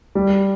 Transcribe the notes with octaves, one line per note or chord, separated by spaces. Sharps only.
G3